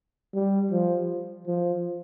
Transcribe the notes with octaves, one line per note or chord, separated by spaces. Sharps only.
G3
F3
F3